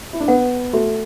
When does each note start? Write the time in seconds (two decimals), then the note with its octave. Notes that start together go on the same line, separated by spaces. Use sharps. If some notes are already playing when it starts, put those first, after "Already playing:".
0.13 E4
0.20 D4
0.28 B3 F#5
0.73 A3 F#4